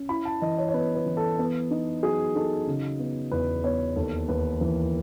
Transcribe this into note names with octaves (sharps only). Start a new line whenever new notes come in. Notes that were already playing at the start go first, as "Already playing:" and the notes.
Already playing: C#4
E4 B5
A5
E3 D#5
C#5
C#5
B3 B4
B4
E3
A4
B3
D#4
F#3 G#4
D#4 A4
C#3
B3
E2 B4
B3 C#5
D#2 A4
D#2 B4
E3